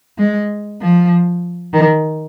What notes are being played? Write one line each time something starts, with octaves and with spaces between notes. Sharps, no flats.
G#3
F3
D#3